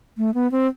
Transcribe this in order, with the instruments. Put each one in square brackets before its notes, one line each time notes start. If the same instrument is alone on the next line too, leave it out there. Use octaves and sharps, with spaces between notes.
[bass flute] A3
B3
C4